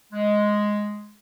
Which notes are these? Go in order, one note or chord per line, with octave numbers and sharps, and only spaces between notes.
G#3